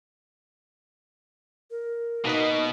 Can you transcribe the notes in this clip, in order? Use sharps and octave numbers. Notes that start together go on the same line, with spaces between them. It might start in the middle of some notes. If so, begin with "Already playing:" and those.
A#4
B2 A#3 D#4 B4 D#5